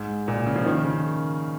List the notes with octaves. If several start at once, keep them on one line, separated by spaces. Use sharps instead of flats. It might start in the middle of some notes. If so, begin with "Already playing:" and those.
Already playing: G#2
A#2
C#3
F3
D#3
C#3